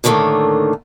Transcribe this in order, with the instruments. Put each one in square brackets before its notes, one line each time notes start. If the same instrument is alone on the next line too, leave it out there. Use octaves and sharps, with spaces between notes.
[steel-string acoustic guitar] A2 D3 D#3 F3 A3 A#3